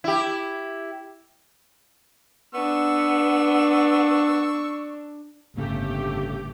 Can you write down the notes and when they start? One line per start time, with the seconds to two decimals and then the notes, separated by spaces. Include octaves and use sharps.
0.04 E4 G4
2.54 B3 D4 C#6 E6
5.57 G1 A2 C#3 A3 A#3 G4